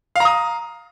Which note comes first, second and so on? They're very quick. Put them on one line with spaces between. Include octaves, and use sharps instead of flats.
F5 A#5 D#6